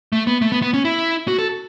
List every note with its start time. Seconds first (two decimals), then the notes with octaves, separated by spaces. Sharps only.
0.12 A3
0.27 B3
0.42 A3
0.52 B3
0.62 B3
0.74 C#4
0.85 E4
1.28 F#4
1.38 A4